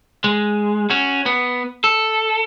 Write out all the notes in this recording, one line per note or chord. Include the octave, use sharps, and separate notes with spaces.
G#3
C#4 F#4
B3
A4